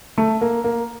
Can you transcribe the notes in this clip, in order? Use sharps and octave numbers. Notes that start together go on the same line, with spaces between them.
A3
A#3
A#3